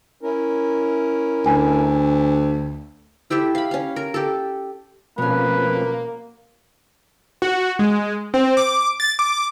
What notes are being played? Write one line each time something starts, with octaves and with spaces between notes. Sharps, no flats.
C#4 E4 A#4
D2 G#5
E4 G4 A4 E5
F5 B5
C#4 F5
A#4
G4 A4
B2 F3 A3 A#3 C4 C#4 B4
F#4
G#3
C4
D6
A6
D6